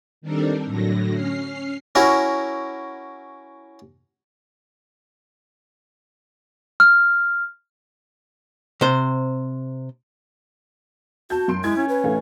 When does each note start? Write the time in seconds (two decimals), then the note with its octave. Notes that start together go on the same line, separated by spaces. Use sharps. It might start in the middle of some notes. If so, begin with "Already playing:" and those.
0.21 D#3 G3 C4 D4 A4 A#4
0.65 A2 D3 F#3 A#6
1.13 C#4 F6 C7
1.95 C#4 E4 F#4 A#4
6.80 F6
8.81 C3 C5
11.30 F#4 A5 G6
11.48 F#2 C6 D7
11.64 G#3 E4 G#6
11.77 C#4
11.89 B4
12.04 A1 A3 F5